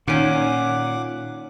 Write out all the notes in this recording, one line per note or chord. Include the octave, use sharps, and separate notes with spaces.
A#2 D#3 C#4 F#5 D6